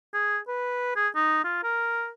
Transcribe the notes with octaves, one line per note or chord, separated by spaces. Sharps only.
G#4
B4
G#4
D#4
F4
A#4